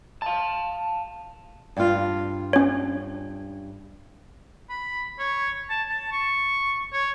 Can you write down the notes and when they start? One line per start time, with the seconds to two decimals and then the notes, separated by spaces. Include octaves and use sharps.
0.22 F5 A5
1.77 G2 F4
2.53 C#4 C#5
4.69 B5
5.19 C#5
5.69 A5
5.88 A5
6.12 C#6
6.93 C#5